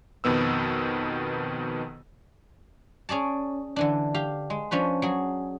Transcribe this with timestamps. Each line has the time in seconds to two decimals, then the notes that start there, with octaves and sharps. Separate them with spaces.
0.24 F2 B2 D#3 B3 E6
3.09 C#4 G#4 D5 A5
3.76 D3 E3 D4
4.14 G4 F5
4.50 G#3
4.71 F3 C#4 D4 B4
5.02 F#3 G#4